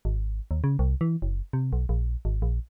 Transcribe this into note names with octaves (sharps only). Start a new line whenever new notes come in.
G#1
D#2
C#3
C2
E3
F#1
C3
B1
A#1
G#1
A#1